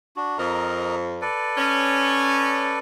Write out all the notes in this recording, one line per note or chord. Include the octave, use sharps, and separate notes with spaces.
D4 F#4
F2 A#4 D#5 A#5
A4 B4 D5
C#4